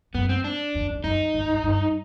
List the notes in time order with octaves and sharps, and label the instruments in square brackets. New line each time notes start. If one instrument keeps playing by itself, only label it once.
[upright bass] F#2 [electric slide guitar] B3
[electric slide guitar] C4
D4
[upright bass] F2
F2
[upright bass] F#2 [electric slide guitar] D#4
[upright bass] G2
G#2
G2